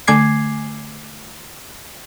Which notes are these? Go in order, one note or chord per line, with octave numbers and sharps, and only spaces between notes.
D3 A3 G#5 D6 G#6 C7